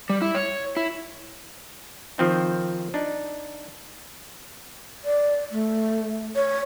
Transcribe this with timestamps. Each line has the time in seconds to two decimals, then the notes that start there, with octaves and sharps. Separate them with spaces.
0.09 G3
0.22 E4
0.35 C#5
0.77 E4
2.18 D#3 F3 C4 D#4
2.94 D4 D#4
5.05 D5
5.51 A3
6.36 C#5